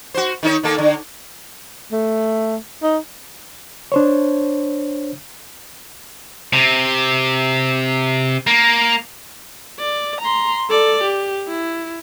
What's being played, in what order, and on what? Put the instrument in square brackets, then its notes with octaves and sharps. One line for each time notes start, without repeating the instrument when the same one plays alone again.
[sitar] F#4 C5
D#3 D#4 C#5
D#3 A#3 A4
D3
[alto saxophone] A3
D#4
[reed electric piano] D4 C5 C#5
[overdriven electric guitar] C3
A#3
[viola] D5
A#5 C6
A4 D5
G4
E4